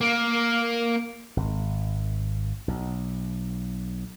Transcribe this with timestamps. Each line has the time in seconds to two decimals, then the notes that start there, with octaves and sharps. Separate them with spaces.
0.01 A#3
1.37 G#1
2.68 B1